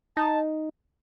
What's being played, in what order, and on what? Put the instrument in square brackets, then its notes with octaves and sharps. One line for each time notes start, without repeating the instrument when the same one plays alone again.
[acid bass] D#4 [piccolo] A5